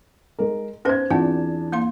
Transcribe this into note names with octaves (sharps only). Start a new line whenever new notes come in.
G#3 A#4
B3 C#4 B4 C5 G#6
E2 C4 D4 F4 F#5 A5
A#3 F5 C6